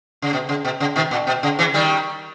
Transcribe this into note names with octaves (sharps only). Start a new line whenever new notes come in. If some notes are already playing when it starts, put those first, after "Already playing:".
C#3
B2
C#3
B2
C#3
B2 D#3
A#2
B2
C#3
C#3 E3
D#3 G3